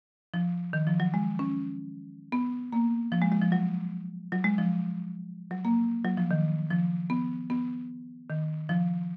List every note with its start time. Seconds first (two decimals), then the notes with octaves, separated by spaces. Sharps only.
0.34 F3
0.73 D#3
0.87 F3
1.00 F#3
1.14 G#3
1.39 C#4
2.32 B3
2.72 A#3
3.12 F3
3.22 G#3
3.32 G#3
3.42 F3
3.52 F#3
4.32 F#3
4.44 G#3
4.58 F3
5.51 F#3
5.65 A#3
6.05 F#3
6.17 F3
6.31 D#3
6.71 F3
7.10 B3
7.50 B3
8.30 D#3
8.69 F3